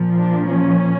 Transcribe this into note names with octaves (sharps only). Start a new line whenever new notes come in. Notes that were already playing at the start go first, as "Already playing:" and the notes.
Already playing: A#2 F3
D4
C#4